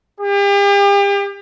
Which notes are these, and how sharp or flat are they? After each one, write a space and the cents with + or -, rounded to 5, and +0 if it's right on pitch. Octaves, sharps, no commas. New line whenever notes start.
G4 +40